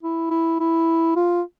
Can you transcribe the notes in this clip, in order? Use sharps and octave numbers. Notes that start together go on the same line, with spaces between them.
E4
E4
E4
F4